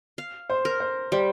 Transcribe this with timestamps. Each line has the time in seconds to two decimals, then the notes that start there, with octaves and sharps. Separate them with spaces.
0.18 F5
0.50 C5
0.65 A#4
0.80 C5
1.12 G3 C5